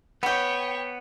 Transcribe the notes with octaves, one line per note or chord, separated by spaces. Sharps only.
B3 F#4 G4 C#5 G5